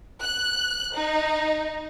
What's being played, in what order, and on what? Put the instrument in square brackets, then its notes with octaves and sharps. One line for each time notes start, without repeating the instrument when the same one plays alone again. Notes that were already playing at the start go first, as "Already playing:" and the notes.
[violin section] F#6
D#4